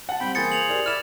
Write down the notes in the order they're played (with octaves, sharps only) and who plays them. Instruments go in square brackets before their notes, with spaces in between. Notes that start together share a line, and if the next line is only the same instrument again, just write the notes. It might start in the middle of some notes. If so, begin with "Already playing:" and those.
[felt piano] F#5 A5
[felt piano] G3 C4 [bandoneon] G5 B5
[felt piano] E3 A#3 [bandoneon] G#4 C5 [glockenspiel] G#6 A6 C#7
[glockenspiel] F7 F#7
[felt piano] G4 A#4 D5
[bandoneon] E4 D5 [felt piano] D#6 [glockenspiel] F6 E7